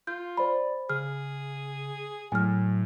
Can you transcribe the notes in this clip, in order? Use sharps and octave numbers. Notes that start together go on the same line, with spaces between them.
F4 G6
C5 D5 B5
C#3 G#4 F6
A2 F#3 G#5 F6